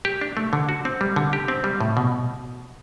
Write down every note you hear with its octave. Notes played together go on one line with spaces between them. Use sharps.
G4
D4
A3
D3
F#4
C4
G3
D3
G4
C4
G3
A2
B2